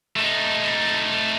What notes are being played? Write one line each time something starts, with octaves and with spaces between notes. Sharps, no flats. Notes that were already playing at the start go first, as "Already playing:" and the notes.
A3 D#4